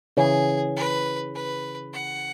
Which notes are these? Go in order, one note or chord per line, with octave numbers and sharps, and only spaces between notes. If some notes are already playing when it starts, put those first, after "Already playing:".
C#3 E3 C#4 G#4
B4
B4
F#5